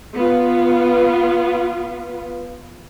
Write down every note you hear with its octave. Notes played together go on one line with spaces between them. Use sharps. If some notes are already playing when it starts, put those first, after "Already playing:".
B3 F4